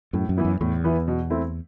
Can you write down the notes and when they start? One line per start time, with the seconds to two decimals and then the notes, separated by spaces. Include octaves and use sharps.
0.13 F#2 A2
0.29 F#2
0.37 E3 B3 E4
0.45 F#2
0.61 E2 A2
0.84 E3 B3 E4
1.08 B2
1.30 A3 C4 E4